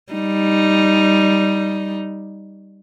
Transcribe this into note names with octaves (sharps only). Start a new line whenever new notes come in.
G3 D#4